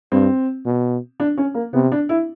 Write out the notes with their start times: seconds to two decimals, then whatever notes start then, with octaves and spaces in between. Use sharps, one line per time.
0.11 G2 C4
0.65 B2
1.20 D4
1.38 C#4
1.54 A#3
1.73 C3 B3
1.92 D4
2.09 E4